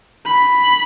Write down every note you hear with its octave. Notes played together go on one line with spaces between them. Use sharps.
B5